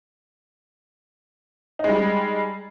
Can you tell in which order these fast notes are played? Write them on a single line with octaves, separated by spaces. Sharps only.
D#4 G#3 G3